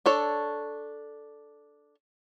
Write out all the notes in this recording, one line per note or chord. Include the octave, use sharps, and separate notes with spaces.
D4 A4 C#5